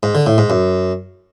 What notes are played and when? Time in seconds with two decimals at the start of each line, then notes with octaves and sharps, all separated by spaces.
0.03 G#2
0.15 D3
0.26 A2
0.38 G#2
0.50 F#2